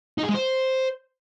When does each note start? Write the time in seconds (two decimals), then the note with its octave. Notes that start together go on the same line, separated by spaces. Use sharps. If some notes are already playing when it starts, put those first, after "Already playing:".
0.18 D#4
0.24 G#4
0.29 G#3
0.34 C5